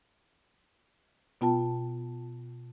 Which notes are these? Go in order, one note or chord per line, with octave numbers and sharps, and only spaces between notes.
B2 B3 F4 G5 A5